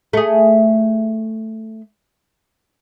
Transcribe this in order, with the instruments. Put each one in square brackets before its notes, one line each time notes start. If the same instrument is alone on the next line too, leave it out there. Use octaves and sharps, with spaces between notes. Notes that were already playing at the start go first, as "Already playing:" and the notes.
[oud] A3 G#4